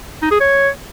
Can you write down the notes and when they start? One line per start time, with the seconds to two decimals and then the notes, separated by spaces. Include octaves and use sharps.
0.22 D#4
0.31 G#4
0.40 C#5